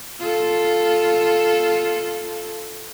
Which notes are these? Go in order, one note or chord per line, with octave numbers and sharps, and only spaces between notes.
F4 A4